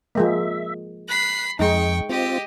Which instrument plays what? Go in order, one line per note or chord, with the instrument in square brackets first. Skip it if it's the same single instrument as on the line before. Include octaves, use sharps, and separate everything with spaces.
[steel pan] F3 G#3 A#3 [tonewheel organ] E5
[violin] B5 C7 [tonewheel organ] F#6
[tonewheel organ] F2 [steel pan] G#3 D#4 [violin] G5 C#6
[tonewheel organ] C4 F4 [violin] G4 D#5